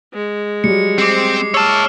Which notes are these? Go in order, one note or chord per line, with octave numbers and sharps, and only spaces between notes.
G#3
F#3 G3 C#7
C4 D6 C7
C#5 A5 E6 F6